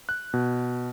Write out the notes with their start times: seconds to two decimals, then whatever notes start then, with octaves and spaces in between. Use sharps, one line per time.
0.09 F#6
0.34 B2